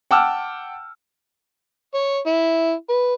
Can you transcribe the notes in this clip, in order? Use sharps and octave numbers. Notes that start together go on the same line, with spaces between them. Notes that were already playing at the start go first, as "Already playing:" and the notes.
F#5 G5 A5 D6 E6 F6
C#5
E4
B4